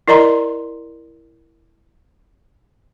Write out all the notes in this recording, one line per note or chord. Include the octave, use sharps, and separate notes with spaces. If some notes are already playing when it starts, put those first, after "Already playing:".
E4 A#4 D5 D#5 A#5 C6